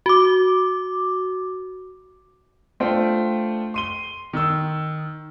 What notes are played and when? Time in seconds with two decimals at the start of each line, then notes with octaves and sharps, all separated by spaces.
0.06 F#4 D6
2.80 A3 D4 F4 C5 G5 C6
3.74 C6 D#7 G7
4.33 D#3 E6